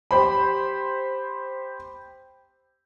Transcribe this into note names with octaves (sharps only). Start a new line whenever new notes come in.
G4 C5 B5